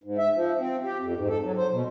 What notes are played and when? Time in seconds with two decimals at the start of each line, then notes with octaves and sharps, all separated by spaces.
0.04 G#2
0.18 E5
0.34 F3
0.59 C4
0.84 G4
1.01 F2
1.17 G#2
1.29 A4
1.44 F#3
1.57 C5
1.72 B2